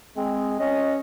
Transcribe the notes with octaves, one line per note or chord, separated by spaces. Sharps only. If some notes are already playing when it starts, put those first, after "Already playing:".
G#3 C4
C#4 D#5